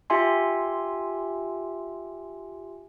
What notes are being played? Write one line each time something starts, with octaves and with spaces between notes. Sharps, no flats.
F4 G4 E5 G#5 C6